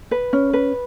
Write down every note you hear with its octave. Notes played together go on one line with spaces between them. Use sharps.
B4
C#4
B4